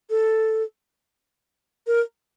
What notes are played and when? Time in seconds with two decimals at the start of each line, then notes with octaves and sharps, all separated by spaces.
0.10 A4
1.87 A#4